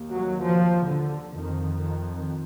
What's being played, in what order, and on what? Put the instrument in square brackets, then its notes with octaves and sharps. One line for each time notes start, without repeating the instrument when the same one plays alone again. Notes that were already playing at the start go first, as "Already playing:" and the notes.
Already playing: [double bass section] D#2
F#3
F3
D3
F2 D#3
D#3